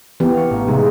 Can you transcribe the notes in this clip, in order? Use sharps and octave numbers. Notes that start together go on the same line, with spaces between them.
E3 B3 G4
F5 C#6
A1
C3 G#3 D#4